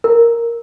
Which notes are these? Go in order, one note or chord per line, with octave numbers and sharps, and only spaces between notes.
A#4